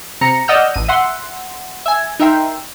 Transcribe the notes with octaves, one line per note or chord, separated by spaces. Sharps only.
C3 A#5 C#7
D5 D#5 F#5 E6 F6 G6
A1 D#7
E5 F#5 C6
E5 G#5
D#4 A#4 E5 G5 C6